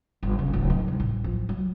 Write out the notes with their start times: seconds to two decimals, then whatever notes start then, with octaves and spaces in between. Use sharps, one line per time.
0.23 G1
0.39 C#3
0.53 D1
0.70 D#3
0.88 C2
1.00 A1
1.24 F3
1.49 F#3